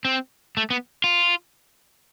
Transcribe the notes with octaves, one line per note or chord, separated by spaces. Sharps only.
C4
A3
B3
F4